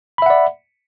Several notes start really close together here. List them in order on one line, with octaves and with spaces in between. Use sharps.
B5 E5 F#5 D5